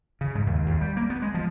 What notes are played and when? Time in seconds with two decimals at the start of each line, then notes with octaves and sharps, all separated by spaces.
0.21 C#3
0.35 G#2
0.46 D#2
0.66 D#2
0.81 G3
0.97 A#3
1.10 B3
1.22 G#3
1.34 F3